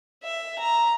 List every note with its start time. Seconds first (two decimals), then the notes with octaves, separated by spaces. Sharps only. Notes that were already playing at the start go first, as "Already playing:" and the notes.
0.23 E5
0.59 A#5